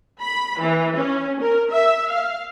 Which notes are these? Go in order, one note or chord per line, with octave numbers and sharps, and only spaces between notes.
B5
E3
C#4
A#4
E5
F5